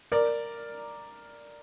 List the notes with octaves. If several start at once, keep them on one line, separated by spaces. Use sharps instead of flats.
A#4 D5